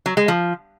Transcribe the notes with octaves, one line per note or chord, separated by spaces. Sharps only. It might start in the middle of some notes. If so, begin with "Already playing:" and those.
F#3
G#3
F3